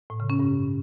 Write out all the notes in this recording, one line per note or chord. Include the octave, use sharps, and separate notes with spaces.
A2
C#3
C#4
G2